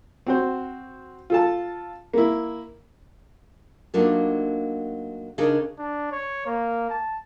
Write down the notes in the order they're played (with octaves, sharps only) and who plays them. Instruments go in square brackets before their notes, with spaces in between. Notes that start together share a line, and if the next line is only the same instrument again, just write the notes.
[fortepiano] C4 F#4 C5
F4 A4 A5
A#3 E4
[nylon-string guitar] F#3 A3 A#3 D4 D#4 F4
C#3 D4 D#4 G#4 A#4
[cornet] D4
C#5
A#3
A5